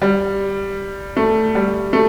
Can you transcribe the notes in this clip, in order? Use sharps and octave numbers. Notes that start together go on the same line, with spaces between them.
G3
A3
G3
A3